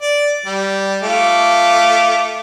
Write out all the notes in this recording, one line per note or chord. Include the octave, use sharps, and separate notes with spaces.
D5
G3
A3 F4 D6